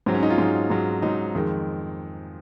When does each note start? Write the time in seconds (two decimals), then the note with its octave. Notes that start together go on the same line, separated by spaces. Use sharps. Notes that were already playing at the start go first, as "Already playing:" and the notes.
0.06 G#2 F#3 C4
0.15 C#4
0.23 D#4
0.30 F4
0.38 G#2 F#3
0.70 G#2 F#3
1.02 G#2 F#3 D#4
1.34 F2 D#3 G#3